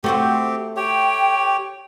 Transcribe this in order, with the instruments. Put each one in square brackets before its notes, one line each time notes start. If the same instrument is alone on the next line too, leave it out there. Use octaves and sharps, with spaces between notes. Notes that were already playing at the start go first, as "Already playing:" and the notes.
[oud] A3 F#4 C5 [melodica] C4 G4
[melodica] G4 C#5 [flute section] G5